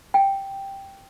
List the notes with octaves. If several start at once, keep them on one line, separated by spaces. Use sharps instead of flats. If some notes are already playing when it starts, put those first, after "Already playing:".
G5